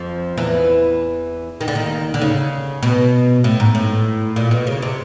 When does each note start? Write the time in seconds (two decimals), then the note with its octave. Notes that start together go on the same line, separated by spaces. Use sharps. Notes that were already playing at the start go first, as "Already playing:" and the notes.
Already playing: F2 F3
0.37 E2 E3
1.61 D#3
1.68 D3
1.75 D#2 D#3
2.14 D3
2.22 C#3
2.83 B2
3.44 A2
3.60 G#2
3.75 A2
4.36 A#2
4.51 B2
4.67 C#3
4.82 C3